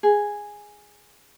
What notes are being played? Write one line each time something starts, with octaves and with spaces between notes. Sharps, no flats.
G#4